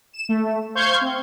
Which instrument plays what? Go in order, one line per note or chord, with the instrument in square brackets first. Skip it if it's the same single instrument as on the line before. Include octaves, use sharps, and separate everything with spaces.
[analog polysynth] E7
A3
C5 F5 C#6 G6 G#6 C7
C4